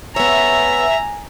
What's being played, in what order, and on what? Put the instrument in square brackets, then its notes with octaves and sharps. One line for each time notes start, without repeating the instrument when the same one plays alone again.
[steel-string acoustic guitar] B3 C#5 [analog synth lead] E5 [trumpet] G#5 [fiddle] A#5